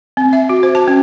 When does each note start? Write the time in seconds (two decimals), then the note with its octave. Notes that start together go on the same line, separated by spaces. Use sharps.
0.17 C4
0.33 E5
0.49 F#4
0.63 C5
0.75 A5
0.88 C#4